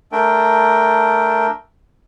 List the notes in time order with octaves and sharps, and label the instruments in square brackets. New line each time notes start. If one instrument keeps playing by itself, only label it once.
[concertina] A3 D4 A#4 G5